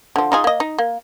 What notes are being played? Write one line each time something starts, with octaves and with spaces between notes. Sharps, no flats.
D3 F3
D#4 F4 G#4
A#3 D#5
D#4
A#3